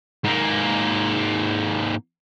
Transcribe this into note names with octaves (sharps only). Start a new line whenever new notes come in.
G#2 A#3